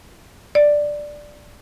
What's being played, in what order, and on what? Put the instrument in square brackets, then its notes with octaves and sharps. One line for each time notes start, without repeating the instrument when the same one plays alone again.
[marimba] D5